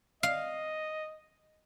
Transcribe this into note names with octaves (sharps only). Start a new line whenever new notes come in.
D#5 F5